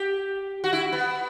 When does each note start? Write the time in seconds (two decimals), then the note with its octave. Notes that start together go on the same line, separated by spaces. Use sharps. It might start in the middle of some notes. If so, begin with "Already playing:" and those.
Already playing: G4
0.64 F#4
0.73 E4
0.93 B3